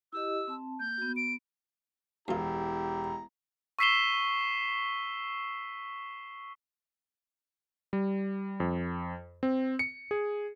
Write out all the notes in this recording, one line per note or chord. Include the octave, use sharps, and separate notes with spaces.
E4 G4 D#5 E6
C4 A5
A#3 G6
B3 F#4
D7
E1 F#2 E4 F4 G4 A#5
C#6 E6 B6 C7 E7 G7
G3
F2
C4
C#7
G#4